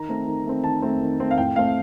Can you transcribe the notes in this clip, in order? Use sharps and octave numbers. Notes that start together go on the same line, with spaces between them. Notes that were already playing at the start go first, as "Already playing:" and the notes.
Already playing: D#3 A#5
A3 C4
D#3
A3 C4
D#3 A5
A3 C4
D#3
A3 C4
F5
A2 G5
A3 C4 F5